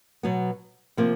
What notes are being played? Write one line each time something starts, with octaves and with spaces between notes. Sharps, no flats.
B2 F#3 B3
C3 F3 A#3